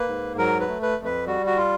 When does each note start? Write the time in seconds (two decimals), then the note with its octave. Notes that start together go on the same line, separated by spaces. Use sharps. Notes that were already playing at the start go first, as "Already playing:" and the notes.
Already playing: A#3 B4
0.08 G#2
0.38 F#3 A#4
0.60 B4
0.68 A3
0.82 B4
0.98 F2
1.05 B4
1.27 G3 F#4
1.46 F#4
1.57 F4